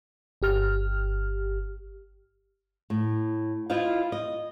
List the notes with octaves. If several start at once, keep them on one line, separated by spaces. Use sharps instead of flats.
G1 G4 F6
A2
E4 F4 C5 D#5 F5
D#5